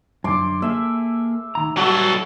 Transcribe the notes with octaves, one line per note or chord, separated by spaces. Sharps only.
F#2 D3 C6 D6
A#3 G#4 A4 E5
D2 D#3 A#5
F#3 G3 F#4 A4 A5